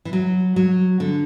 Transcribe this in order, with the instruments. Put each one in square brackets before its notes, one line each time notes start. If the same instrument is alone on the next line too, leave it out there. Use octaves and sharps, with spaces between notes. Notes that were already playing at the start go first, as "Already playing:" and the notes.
[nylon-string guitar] E3
F#3
F#3
D3